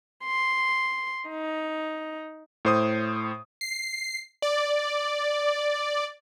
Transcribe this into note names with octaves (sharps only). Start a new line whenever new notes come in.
C6
D#4
A2 C5 D#6
C7
D5